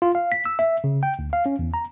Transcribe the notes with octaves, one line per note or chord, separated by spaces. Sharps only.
F4
F5
B6
E6
E5
C#3
G5
D2
F5
C#4
E2
A#5